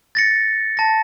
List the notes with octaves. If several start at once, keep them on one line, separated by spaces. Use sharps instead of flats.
A6 A#6 C#7
A5 A#6